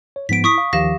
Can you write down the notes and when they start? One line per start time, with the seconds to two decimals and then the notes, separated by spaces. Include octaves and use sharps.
0.16 C#5
0.29 G#2 F3 B3 B6 D7
0.44 E4 C#6 D#6 B6
0.58 F5
0.73 D#2 D#3 F3 G4 F5 A#6